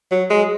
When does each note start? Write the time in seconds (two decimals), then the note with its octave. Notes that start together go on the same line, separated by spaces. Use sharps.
0.11 F#3
0.30 G#3